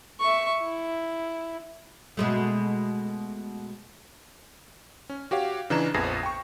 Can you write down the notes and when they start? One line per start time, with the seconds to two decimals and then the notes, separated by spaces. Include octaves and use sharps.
0.20 E5 C#6
0.62 E4
2.17 B2 G#3 A3
5.09 C#4
5.31 F#4 G4 C#5 F5
5.70 C#3 E3 D4 D#4 A#5 E7
5.94 A#1 F2 B3 G#4 A#6 C7
6.23 G5 C#6